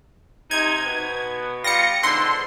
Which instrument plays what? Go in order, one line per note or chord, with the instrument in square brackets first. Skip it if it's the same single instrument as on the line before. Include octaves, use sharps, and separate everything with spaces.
[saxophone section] C3 D#4 [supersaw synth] G#6
[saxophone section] B2 B3
[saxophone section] G3 F4 [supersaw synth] A#6 C#7
[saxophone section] G#2 B2 D3 [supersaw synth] C6